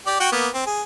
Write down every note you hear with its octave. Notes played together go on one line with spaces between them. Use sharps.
G4 D5
F#4 G5 C#6
A#3 B3
C4
G#4